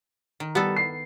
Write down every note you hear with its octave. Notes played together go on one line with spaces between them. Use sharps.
D#3
G3 B3 A4
C7